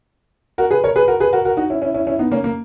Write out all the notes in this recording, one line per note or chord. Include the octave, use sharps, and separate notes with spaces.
F#4 A#4
G#4 B4
A#4 C#5
G#4 B4
F#4 A#4
G#4 B4
F#4 A#4
F#4 A#4
D#4 F#4
C#4 E4
C#4 E4
C#4 E4
C#4 E4
B3 D#4
A#3 C#4
A#3